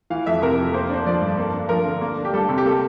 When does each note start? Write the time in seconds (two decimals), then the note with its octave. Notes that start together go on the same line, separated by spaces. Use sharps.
0.10 E3 F5
0.26 F2 E5
0.42 C3 A#4
0.58 F2
0.74 A#3 C5
0.89 D4 C5
1.06 F3 D5
1.21 G2
1.37 A#3 A4
1.53 D4
1.69 F3 A#4
1.86 D3
2.01 A#3
2.18 D4
2.25 G4
2.34 G3 A4
2.49 C3
2.58 G4
2.65 A#3 A4